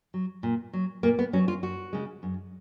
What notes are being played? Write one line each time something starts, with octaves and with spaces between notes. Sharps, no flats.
F#3
A#2
F#3
A#2 A#3
B3
F#3 C#4
F4
F#2 F#4
C#3 G#3
F#2